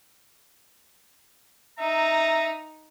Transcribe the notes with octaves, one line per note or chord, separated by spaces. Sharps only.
D#4 E5 A#5